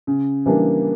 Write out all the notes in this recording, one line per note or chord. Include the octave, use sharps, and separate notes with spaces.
C#3
E3 G3 A#3 D4